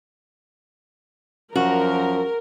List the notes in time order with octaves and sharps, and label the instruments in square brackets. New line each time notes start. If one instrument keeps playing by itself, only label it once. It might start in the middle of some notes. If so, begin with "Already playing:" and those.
[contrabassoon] F#2 [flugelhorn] F3 [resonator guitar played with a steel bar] F#4 [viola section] A#4